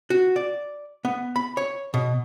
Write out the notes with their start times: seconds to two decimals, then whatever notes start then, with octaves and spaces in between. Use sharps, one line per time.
0.10 F#4
0.36 D5
1.05 B3
1.36 B5
1.57 C#5
1.94 B2